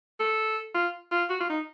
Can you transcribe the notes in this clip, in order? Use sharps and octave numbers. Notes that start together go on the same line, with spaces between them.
A4
F4
F4
F#4
F4
D#4